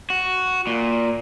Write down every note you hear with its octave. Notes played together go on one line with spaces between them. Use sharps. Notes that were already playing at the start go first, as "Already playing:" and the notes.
F#4
A#2